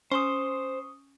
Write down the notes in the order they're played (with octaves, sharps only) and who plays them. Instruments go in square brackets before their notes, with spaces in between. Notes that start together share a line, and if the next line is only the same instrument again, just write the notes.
[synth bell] C#4 [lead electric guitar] C5 C6 [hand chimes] C#6 D#6